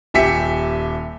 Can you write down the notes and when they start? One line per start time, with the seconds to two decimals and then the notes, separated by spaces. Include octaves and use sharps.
0.14 D#1 G4 E5 G#5 B6 C#7